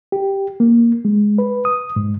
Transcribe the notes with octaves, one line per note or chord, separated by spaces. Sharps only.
G4
A#3
G#3
B4
D#6
G#2